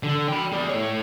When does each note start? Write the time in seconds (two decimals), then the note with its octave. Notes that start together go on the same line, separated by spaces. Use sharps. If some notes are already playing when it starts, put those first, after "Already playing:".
0.03 D3
0.28 G5 B5
0.53 G#4 D5
0.69 A2 C#5